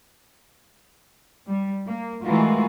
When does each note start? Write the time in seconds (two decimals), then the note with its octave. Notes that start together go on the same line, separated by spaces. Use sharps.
1.48 G3
1.86 A#3
2.25 E3 G#3 A3 F4 F#4 A#4